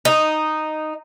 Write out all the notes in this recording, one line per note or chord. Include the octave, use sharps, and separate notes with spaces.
D#4